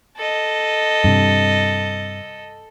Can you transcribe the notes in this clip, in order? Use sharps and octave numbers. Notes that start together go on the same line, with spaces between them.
A4 D#5
G2 C3